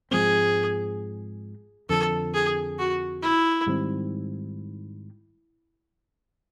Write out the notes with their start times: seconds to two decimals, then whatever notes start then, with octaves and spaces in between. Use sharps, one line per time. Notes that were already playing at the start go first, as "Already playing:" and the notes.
0.11 G#2 F3 G#3 C4 G#4
1.89 F2 D3 F3 A4
2.34 G#4
2.79 F#4
3.22 E4
3.67 G#2 D#3 G3 C4